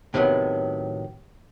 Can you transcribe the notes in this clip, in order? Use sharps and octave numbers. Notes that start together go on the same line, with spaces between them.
A2 C3 D#3 E3 F#3 B3